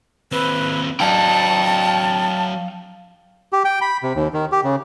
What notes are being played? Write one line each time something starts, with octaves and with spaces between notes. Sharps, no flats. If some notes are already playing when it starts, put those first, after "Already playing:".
D#2 C4 B4
F#3 D4 F5 G5 A5
G4
G5
B5
C3
D#2
D#3
G4
C#3